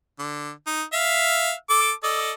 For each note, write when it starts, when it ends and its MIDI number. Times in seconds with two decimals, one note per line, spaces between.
0.19 0.51 50
0.66 0.83 63
0.93 1.53 76
0.93 1.53 77
1.70 1.92 69
1.70 1.92 86
2.03 2.32 69
2.03 2.32 74
2.03 2.32 75